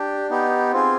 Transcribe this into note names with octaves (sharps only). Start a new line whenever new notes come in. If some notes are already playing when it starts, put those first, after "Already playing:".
Already playing: D4 G4
B3 D#4 G4
C4 F4 G#4